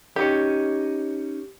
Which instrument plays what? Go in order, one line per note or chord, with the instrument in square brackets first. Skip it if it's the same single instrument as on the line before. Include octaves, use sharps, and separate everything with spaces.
[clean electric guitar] C#4 D#4 C#5 [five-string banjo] G4